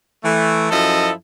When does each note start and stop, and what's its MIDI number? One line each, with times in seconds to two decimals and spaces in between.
0.24 0.69 52
0.24 0.69 57
0.70 1.12 42
0.70 1.12 53
0.70 1.12 64
0.70 1.12 69
0.70 1.12 75